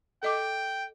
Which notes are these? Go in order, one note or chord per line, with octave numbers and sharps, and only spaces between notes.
A4 D#5 G5 D6